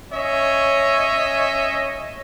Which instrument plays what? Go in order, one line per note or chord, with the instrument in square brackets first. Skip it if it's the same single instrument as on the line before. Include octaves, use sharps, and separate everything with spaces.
[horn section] C#4 C#5 D#5 E5